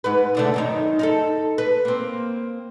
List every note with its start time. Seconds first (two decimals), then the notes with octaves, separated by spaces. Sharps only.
0.04 G#2 B4
0.35 B2 D3 A3
0.54 F#2 D#3 D#4
0.99 D#4 F4 A4
1.58 B4
1.85 A#3 C4